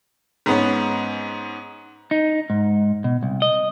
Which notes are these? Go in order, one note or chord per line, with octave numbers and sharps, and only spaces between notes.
G#2 B3 C#4
D#4
G#2
B2
C2
D#5